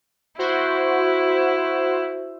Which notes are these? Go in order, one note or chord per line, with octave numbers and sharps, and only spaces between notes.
E4 F#4 C5